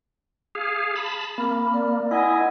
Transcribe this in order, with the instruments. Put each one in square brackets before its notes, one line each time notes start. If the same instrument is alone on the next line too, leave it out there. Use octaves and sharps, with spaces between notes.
[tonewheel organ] G#4 F5
A5 B5
[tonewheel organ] A#3 [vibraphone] C4 A#4 [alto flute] B5
[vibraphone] A#4 [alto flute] D5
[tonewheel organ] E4 [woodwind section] A#4 D#5 G#5 [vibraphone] F#5